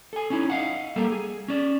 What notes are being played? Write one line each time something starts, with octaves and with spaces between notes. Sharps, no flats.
A4 G#5
C#4 D#4 E4 C#5
D#5 F5 F#5
G3 A#3 A4 A#4
G#4
C#4 D5